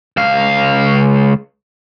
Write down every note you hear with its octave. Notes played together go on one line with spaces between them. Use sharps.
C#2 F5